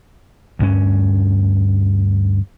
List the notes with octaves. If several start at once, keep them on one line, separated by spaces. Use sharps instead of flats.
D2 G2 C#4